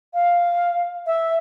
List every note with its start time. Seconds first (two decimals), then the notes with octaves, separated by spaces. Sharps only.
0.14 F5
1.07 E5